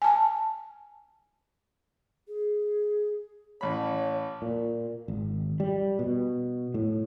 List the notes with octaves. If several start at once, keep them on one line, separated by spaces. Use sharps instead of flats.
G#5 A5
G#4
A1 C#5 B5
A#2
G#1
G3
B2
A2